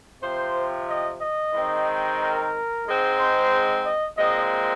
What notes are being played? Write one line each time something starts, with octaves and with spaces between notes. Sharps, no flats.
C3 F3 C4 C5
D#5
D#5
D#3 G#3 C4
A#4
G#2 G#3 C4
C5
D#5
A#2 G#3 C4 D#5